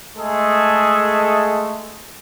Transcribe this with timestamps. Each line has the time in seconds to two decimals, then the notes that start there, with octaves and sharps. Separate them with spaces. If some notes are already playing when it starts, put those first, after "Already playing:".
0.17 G#3 A3 G#4 A4 D#5